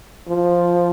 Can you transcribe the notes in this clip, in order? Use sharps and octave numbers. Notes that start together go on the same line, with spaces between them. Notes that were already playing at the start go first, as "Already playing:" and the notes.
F3